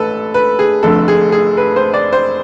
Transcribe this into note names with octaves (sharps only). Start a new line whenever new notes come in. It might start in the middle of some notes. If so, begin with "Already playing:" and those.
Already playing: A1 A3 A4 B4
B4
G#4
F1 F2 D3 A3 A4
G#4
G#4
B4
C5
D5
C5